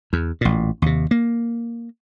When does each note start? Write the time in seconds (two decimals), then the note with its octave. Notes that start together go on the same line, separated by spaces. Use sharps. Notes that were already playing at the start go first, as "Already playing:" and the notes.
0.13 E2
0.41 A1 A#2
0.82 D#2 C3
1.11 A#3